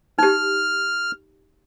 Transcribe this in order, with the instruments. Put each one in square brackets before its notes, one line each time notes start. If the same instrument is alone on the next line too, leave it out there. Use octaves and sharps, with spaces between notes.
[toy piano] D#4 G4 [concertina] F6